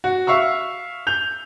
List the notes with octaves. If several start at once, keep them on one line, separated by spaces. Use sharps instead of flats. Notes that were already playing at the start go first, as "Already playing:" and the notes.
F#4
E5 F5 C#6 E6
G6 F7